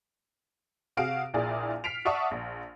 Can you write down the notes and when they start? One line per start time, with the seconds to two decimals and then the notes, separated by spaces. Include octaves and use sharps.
0.97 C3 F#4 G#4 F5 D7
1.34 A#1 A#2 E4 G#4 D5
1.84 F6 B6 C7 D7 F7
2.05 D5 E5 F#5 A5 C#6 D#6
2.31 A#1